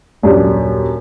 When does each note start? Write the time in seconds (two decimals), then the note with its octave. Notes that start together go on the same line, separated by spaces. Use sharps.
0.23 D#1 F#2 D4 G4